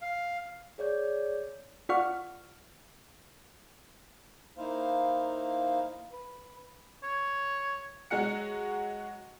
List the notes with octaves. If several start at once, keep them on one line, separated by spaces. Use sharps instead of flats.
F5
G#4 C#5 D5 G6
F4 D5 F#5 C#6 F6
A#3 D#4 E4 C5 F5
B4
C#5
F#3 G#3 F#4 F#5 C#7